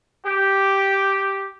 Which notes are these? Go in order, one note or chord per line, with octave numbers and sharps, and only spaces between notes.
G4